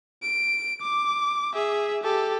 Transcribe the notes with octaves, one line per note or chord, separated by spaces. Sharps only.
D7
D6
G#4 E5
G4 A4